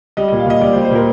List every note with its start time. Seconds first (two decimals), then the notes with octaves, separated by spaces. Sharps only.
0.17 G3 D#5
0.28 A#2 D#5
0.40 F5
0.46 A#2 D#5
0.61 G3 D5
0.73 C5
0.76 G3
0.85 C5
0.91 A#2 A#4